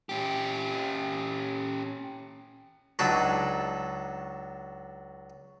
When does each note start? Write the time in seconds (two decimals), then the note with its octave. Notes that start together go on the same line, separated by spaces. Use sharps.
0.09 C#4 G4
2.99 C#2 F#3 D4 D#4 A5 B5